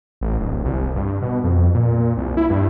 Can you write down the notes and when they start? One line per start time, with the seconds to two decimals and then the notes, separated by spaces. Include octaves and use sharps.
0.21 A1
0.40 D1
0.65 C2
0.96 G2
1.22 B2
1.44 F2
1.74 A#2
2.17 C2
2.37 E4
2.50 G2